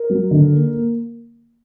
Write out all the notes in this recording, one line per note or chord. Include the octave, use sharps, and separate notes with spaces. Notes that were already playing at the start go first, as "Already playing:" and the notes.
Already playing: A#4
F#3
D3
A#3
A#3